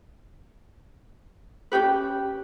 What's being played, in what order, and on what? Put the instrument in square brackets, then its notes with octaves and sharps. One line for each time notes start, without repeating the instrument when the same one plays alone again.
[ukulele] C#4 D4 G4 B4